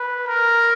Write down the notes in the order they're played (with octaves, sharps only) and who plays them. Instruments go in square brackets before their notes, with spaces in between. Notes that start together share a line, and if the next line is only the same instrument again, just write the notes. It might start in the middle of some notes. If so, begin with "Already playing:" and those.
Already playing: [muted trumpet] B4
A#4